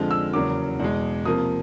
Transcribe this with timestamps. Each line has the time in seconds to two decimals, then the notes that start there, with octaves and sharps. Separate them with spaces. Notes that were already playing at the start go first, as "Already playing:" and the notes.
Already playing: F2 D3 F3 G#3 F6
0.11 E6
0.33 E2 C#3 F#3 A#3 D6
0.80 E2 B2 G#3
1.25 C3 F3 A#3 D#6